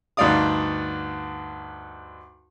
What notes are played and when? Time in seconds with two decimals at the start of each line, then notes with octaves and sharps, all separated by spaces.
0.17 D2 G2 D#4 D5 F5 D#6